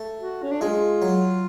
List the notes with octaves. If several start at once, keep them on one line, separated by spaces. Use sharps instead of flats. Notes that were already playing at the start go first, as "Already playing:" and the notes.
Already playing: A3
F#4
C#4
D4
G#3 F4
F#3